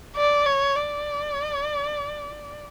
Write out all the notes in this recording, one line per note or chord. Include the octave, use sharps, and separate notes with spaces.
D5
C#5
D5